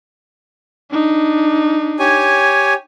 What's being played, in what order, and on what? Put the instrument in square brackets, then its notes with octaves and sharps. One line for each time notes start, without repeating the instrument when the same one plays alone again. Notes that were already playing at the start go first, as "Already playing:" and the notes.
[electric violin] D4 D#4
[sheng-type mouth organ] G4 C#5 G#5